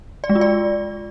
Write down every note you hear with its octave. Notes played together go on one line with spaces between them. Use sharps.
D5
G#3
F4
D5